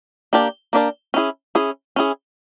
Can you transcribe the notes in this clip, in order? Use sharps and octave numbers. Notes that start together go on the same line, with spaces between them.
A#3 D4 G4 A#4 D5
A#3 D4 G4 A#4 D5
C#4 E4 G#4
C#4 E4 G#4
C#4 E4 G#4